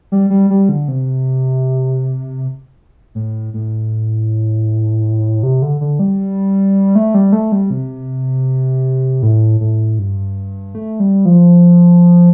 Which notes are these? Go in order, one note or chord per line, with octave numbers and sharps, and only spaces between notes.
G3
G3
G3
D3
C3
A2
A2
C3
D3
D3
G3
A3
G3
A3
G3
C3
A2
A2
G2
A3
G3
F3